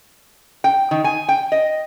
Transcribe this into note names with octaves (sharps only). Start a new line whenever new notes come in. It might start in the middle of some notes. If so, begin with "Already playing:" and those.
G5
D#3
G#5
G5
D#5